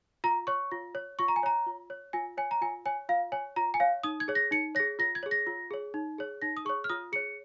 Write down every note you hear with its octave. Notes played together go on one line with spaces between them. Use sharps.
F4 A#5
C#5 C#6
F4
C#5
F4 C#6
A#5
G#5
C#5 A#5
F4
C#5
F4 G#5
C#5 G#5
A#5
F4 G#5
C#5 G#5
F4 F5
C#5 G#5
F4 A#5
G#5
C#5 F5
D#4 D#6
G#6
G#4 C#5
A#6
D#4 C#7
G#4 C#5 A#6
F4 A#6
G#6
G#4 C#5
A#6
F4
G#4 C#5
D#4
G#4 C#5
D#4 A#6
D#6
G#4 C#5 C#6
F6
F4 D#6
G#4 C#5 C#7